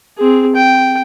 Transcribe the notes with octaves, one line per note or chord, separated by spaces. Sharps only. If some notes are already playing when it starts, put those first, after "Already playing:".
C4 G#4
G5